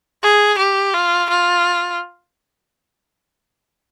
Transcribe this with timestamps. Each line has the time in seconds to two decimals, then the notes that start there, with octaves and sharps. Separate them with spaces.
0.23 G#4
0.59 G4
0.94 F4
1.30 F4